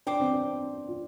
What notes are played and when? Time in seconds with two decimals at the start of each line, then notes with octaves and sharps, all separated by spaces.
0.06 D4 C5 G5 D6
0.20 C4
0.33 D4
0.88 F4